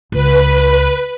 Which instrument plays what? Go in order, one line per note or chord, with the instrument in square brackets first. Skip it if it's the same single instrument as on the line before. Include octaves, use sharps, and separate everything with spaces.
[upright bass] C#2 [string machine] B4